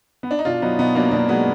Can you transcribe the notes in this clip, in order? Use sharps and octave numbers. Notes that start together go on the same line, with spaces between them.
B3
D4
D#4
B2 D4 F4
F#3 B3 D#4
B2 B3 D#4
F#3 A#3 D4
B2 A#3 D4
F#3 G#3 B3